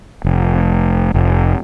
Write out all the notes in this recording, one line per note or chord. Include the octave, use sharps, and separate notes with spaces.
F1
F1